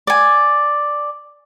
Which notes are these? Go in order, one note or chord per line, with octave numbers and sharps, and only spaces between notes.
D5 G#5